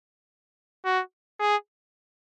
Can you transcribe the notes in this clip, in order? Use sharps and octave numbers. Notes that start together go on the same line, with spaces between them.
F#4
G#4